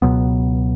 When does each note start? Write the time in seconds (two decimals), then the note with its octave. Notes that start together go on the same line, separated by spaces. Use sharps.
0.02 C#2 B2 F#3 B3